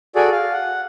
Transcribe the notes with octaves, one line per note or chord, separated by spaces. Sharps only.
F#4 G#4 A4 D5
F5
F#5